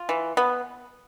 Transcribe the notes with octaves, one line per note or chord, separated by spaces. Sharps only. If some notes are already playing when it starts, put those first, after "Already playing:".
Already playing: F4
E3
B3